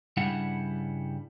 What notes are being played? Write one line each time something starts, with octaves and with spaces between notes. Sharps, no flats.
G2 C#3 G3 D4 E4 F#5